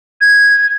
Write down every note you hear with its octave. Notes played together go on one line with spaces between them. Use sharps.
G#6